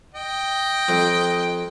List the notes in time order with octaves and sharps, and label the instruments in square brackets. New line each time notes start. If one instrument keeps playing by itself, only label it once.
[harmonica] D#5 G5
[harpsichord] F2